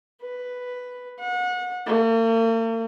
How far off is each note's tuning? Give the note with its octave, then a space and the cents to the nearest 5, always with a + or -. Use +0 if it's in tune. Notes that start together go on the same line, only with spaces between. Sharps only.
B4 +5
F#5 -30
A#3 -45